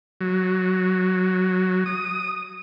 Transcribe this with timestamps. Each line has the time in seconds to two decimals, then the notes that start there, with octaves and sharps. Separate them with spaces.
0.21 F#3
1.86 D#6